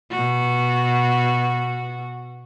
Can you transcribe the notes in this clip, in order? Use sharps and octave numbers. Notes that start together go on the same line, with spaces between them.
B2 F#4